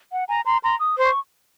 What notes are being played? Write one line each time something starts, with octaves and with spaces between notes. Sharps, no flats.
F#5
G#5 A#5
A#5 C6
A#5 C6
D#6
C5
C#6